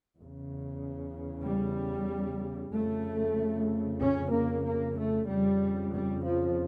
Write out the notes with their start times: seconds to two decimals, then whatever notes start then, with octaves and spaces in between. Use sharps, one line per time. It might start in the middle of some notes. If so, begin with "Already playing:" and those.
0.17 E2 C#3
1.45 G3
2.73 F2 C#3 A3
4.01 C#4
4.33 A#3
4.65 A#3
4.97 A3
5.28 F2 C#3 G3
5.93 G3
6.25 F3